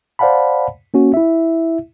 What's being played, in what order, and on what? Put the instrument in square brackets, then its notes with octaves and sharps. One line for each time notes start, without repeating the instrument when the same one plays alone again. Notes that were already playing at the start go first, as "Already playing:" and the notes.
[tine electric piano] C5 D5 F5 F#5 A5 B5
A#3 C#4 F#4
E4 E5